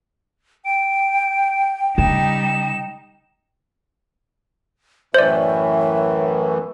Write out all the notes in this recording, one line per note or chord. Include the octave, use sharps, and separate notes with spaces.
G5 D7
C#3 G3 D#4 E7
F#2 A2 E3 C5 D5 E5